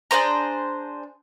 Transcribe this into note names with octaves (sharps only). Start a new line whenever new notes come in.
D4 G#4 C5 A#5